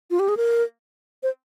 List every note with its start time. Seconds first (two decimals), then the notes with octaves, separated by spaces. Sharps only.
0.11 F4
0.19 G4
0.29 G#4
0.37 A#4
1.23 C5